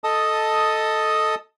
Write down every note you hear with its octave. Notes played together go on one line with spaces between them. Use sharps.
A4 D#5 A5 D#6